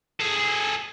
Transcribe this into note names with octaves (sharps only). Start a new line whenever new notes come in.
G#4 A4